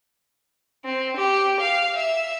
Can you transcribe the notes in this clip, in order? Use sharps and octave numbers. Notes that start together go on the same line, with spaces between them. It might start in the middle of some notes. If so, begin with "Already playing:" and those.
C4
G4
F5
E5